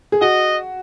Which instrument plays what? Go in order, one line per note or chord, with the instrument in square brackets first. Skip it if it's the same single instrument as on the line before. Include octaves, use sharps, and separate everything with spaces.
[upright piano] G#4
[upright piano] F#4 [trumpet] D#5